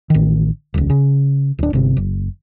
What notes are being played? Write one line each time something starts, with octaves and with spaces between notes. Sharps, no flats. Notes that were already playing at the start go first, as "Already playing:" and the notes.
A1 D#3
D#1 C#2
C#3
D1 D4
G1 C3
F#1